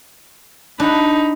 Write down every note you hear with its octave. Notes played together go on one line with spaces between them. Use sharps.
D4 D#4 F#5 B5